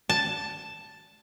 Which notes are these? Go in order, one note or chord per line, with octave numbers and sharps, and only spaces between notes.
A5